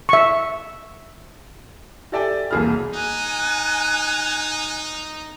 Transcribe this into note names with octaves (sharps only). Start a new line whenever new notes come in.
E5 C#6
G4 A4 D5 E5 G5 G#5
E1 C2 A#3 G#4 B5 F6
D#4 G#5 F#6